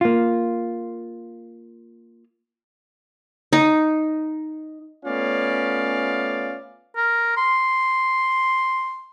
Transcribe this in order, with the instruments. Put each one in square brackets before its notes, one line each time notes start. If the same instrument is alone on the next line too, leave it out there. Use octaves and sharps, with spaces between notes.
[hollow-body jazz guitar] A#3 F4
[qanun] D#4
[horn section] A3 B3 C#4 F4 D5 F5
[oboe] A#4
C6